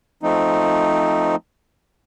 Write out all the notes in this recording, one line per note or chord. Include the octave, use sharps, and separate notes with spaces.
F3 A3 C4 D#4